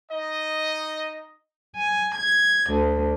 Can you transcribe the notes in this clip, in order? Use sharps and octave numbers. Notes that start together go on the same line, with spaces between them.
D#4 D#5
G#5
G#6
D2